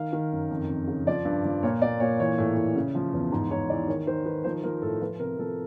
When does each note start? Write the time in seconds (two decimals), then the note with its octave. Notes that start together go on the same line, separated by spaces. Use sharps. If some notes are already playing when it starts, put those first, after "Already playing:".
Already playing: D#3 F5
0.13 D#3
0.32 F#2
0.51 F2
0.69 F2
0.88 C#3
1.07 F3 D5
1.25 G2
1.44 F3
1.63 A#2 C#5
1.82 A#2 D5
2.00 A#2 C#5
2.20 E3 C#5
2.38 A2
2.57 A2
2.76 C#3
2.95 F3
3.13 E2
3.32 G#2
3.51 G#2 C#5
3.70 E3 D5
3.88 D#3 C#5
4.07 D#3 C5
4.26 D#3 B4
4.44 F3 C5
4.63 F3 A#4
4.82 A2 A4
5.01 F3 B4
5.19 C3 A#4
5.38 F3 A4